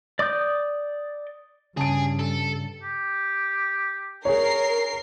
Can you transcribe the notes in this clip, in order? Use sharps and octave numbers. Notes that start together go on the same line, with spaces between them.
D5 D6 D#6 G6
G2 C#3 G#4 A5 D7
A4
G4
G#4 A#4 C#5 C7